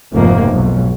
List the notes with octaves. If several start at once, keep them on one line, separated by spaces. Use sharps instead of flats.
F1 G#2 B2 F3 A#3
B1 G#2